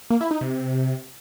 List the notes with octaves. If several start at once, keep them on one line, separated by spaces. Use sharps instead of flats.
A#3
E4
D#4
C3